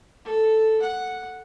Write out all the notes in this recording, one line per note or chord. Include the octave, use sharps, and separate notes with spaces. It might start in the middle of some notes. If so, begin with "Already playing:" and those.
A4
F#5